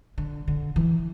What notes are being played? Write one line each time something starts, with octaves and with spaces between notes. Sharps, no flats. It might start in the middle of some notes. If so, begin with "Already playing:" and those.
D3
D3
E3